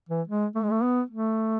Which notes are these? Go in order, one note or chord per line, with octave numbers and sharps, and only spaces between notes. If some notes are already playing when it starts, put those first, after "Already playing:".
E3
G#3
A3
G#3
A3
B3
A3